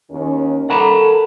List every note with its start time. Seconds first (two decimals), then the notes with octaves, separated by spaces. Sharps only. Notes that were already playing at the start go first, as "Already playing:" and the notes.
0.10 D#2 D#3 C#4
0.70 A4 A#4 F#5 A#5 B5